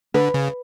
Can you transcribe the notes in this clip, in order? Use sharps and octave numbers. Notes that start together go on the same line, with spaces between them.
D3 B4
C#3